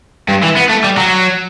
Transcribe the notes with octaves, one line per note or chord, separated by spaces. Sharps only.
G2
E3
B3
A3
G3
F#3